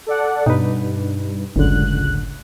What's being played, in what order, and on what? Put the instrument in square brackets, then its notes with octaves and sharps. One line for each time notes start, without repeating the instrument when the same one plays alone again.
[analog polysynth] A4 D5 F#5
[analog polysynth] G2 [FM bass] B2 [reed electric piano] D#4 B4
[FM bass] G1 [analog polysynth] C#2 F#6 [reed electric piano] F#2 A2 D3